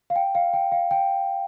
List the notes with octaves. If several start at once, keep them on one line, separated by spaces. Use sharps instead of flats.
F5
G5
F5
G5
F5
G5